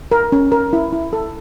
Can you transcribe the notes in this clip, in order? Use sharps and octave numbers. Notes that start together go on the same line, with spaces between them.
A#4
C#4
A#4
E4
E4
A4